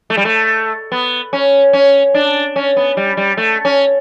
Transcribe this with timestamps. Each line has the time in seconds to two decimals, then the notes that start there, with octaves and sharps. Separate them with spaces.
0.10 A3
0.17 G3
0.25 A3
0.92 B3
1.33 C#4
1.73 C#4
2.14 D4
2.56 C#4
2.77 B3
2.97 G3
3.17 G3
3.37 A3
3.65 C#4